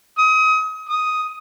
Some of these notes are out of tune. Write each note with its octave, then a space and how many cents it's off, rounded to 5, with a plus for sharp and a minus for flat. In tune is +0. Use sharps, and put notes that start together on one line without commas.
D#6 +30
D#6 +5